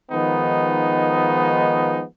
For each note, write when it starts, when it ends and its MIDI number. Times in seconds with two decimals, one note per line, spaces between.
0.11 2.03 51
0.11 2.03 53
0.11 2.03 56
0.11 2.03 59
0.11 2.03 63